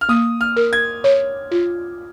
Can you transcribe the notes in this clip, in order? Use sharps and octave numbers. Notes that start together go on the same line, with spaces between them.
F6
A#3 D#6
F6
A#4
G#6
C#5
F4